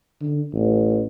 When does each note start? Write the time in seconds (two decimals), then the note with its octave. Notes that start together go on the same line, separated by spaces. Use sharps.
0.21 D3
0.53 A1